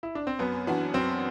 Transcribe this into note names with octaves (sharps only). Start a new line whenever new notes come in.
E4
D4
C4
F#2 B3
E3 B3 D4 F#4
F#2 C4